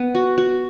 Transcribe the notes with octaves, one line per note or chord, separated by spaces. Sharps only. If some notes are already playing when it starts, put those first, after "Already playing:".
Already playing: B3
F#4
F#4